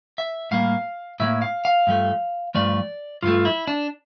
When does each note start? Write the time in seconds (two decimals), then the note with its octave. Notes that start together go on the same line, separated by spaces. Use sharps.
0.18 E5
0.51 A2 G3 A#3 F5
1.20 A2 G3 A#3 E5
1.42 F5
1.65 F5
1.87 G2 F3 A3
2.55 G2 F3 A3 D5
3.23 G2 F3 A3 F4
3.45 E4
3.68 D4